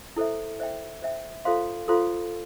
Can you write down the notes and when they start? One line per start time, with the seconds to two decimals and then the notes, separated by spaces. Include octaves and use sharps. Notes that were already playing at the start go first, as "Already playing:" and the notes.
0.16 E4 A4 C5 E5
0.60 C5 E5 G5
1.02 C5 E5 G5
1.45 F4 A4 C5 F5 C6
1.88 F4 A4 C5 F5 C6